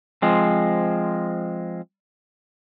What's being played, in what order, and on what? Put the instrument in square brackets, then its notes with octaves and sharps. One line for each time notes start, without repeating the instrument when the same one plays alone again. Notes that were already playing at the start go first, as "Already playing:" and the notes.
[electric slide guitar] F3 G#3 C4